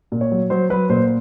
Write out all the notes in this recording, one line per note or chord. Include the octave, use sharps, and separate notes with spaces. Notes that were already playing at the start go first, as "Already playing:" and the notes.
A#2
C#5
F#3
F#3 C5
F#3 B4
A#2 C5